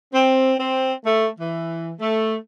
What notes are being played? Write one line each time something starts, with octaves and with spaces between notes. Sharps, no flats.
C4
C4
A3
E3
A3